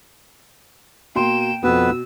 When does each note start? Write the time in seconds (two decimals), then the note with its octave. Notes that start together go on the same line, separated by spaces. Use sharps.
1.16 B2 A#3 G5 C6 E7
1.64 F2 B2 B3 B4 E6